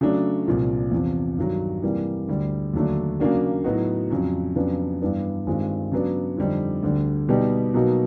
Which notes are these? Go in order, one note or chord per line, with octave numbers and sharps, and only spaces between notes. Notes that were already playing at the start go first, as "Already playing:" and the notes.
C#3 F#3 A3 D4
C2 A#2 F3
E2 C3 F3
G2 D#3 F#3
C3 E3 G3 A#3
D2 D3 G3
D#2 D3 F#3 A3 D4
C#3 F#3 A#3 D4 F#4
A2 F#3 B3 D#4 F#4
F2 C#3 F#3
F2 C#3 F#3 B3 D4
G2 E3 G3 B3 D4
G2 D#3 G#3 C4 F4
C#3 F#3 B3 D4
F2 D3 G3 C4 D#4
D2 D3 G3
B2 G3 B3 D#4 G4
B2 F#3 A#3 D#4 F#4